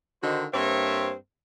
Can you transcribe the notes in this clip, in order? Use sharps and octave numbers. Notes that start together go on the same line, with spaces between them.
D3 D#3 D#4 F#4 C5
G2 A#3 C4 C5 C#5 E5